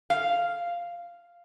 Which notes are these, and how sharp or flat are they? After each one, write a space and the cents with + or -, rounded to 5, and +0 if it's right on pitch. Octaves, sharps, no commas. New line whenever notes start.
F5 -5